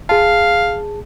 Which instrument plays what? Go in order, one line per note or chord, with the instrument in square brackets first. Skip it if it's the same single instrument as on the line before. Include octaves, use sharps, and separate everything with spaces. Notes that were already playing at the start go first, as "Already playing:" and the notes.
[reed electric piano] G#4 A5 [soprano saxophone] F5